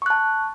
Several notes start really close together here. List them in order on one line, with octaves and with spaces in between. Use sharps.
C#6 F#6 A5